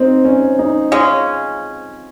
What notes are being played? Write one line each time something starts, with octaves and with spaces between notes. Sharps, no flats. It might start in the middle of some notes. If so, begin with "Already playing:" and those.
Already playing: C4 D#4
C#4
D#4
C#3 G#3 C#4 F4